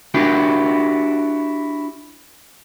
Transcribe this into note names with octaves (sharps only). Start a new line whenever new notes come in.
D4 E4 F#4 G4